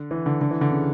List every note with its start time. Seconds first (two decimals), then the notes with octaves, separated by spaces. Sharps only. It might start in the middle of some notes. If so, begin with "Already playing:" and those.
Already playing: D3
0.11 E3
0.26 D3
0.41 D3
0.51 E3
0.61 D3
0.71 C#3